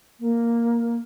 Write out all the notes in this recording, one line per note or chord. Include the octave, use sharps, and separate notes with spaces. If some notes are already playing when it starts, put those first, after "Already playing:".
A#3